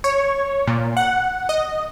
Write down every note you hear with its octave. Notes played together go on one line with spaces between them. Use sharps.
C#5
A#2
F#5
D#5